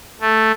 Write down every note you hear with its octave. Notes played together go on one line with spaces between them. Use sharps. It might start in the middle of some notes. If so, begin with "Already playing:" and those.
A3